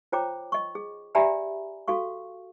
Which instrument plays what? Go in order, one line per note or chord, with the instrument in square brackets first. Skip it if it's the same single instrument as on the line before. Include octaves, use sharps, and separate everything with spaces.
[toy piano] F4 C5 C#5 G5 A#5 D6
D#5 C#6
G#4
G4 D5 E5 G#5 A#5 B5
F#4 A4 F5 C#6